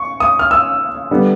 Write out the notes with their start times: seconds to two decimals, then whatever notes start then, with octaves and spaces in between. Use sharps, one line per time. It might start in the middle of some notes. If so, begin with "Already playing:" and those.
Already playing: C#6
0.20 D#6
0.39 F6
0.51 E6
1.11 D3 G3 B3